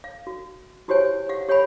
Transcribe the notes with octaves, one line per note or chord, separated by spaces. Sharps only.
F5
F#4
E4 F#4 G4 C5 C#5 G#5
G4 F5 F#5
G4 C#5 F#5 G#5 B5